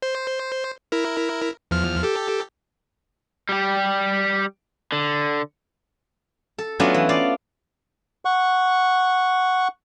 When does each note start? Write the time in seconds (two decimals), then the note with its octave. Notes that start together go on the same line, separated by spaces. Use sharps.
0.02 C5
0.92 E4 A#4
1.71 E2 F3 F6
2.03 G4 A4
3.49 G3 G4
4.92 D3
6.58 A4
6.79 F#3 A3 B3 C#4 D4 F4
6.94 E3
7.09 F4 D5 F5
8.25 F#5 C#6